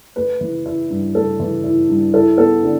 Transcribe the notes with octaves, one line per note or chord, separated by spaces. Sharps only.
A3 B4
E3
E4
G2
A3 A4
E3
E4
G2
E4 A4
B3 A4
D3